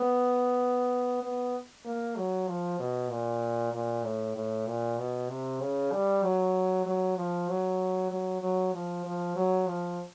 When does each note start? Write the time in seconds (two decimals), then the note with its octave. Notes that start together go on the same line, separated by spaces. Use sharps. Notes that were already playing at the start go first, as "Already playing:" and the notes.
Already playing: B3
1.23 B3
1.85 A#3
2.17 F#3
2.48 F3
2.79 B2
3.11 A#2
3.73 A#2
4.04 A2
4.36 A2
4.67 A#2
4.98 B2
5.29 C3
5.61 C#3
5.92 G3
6.23 F#3
6.86 F#3
7.17 F3
7.49 F#3
8.11 F#3
8.42 F#3
8.74 F3
9.05 F3
9.36 F#3
9.67 F3